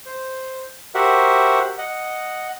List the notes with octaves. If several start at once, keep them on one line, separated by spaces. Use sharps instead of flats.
C5
F#4 G4 A#4 C5 E5 F#5
D#5 F#5